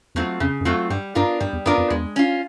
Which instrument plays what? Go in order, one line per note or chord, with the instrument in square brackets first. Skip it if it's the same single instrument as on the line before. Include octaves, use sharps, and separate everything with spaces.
[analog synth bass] E2 [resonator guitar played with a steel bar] F#3 A3 C4 F4
[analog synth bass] F2 [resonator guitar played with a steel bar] C#3
[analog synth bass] F#2
[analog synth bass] F2 [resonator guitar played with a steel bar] F#3 A3 C4 F4
[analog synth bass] G2 [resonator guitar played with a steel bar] G3
[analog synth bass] G2 [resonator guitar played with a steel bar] B3 D4 F4 A#4
[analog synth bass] G2 [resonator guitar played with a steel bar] G3
[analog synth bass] E2
[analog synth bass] F#2 [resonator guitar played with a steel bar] B3 D4 F4 A#4
[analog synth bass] F2
[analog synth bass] E2 [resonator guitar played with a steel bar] G#3
[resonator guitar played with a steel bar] C#4 F4